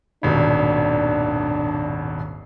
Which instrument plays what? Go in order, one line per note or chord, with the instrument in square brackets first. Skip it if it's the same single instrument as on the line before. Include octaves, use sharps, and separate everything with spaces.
[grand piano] D#1 G#1 B2 [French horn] D4